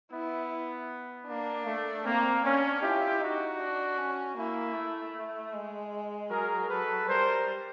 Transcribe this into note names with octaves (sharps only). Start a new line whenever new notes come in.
B3 E4
A#3 D4
A3
A#3 C4
C#4 D4
E4 F4 G4
D#4 F#4
D4
C#4
A#3 E4
A3
G#3
F#3 G#4 A#4
A4 B4
G3 A#4 C5